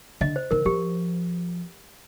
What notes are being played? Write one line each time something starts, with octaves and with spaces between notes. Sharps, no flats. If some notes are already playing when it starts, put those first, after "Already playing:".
D3 D#5
C5
D#3 A#4
F3 G4